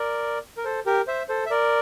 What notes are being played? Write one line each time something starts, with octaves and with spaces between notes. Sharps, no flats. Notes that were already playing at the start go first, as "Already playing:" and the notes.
Already playing: A#4 D5
A#4
A4 C5
G4 A#4
C5 E5
A4 C5
E5
A#4 D5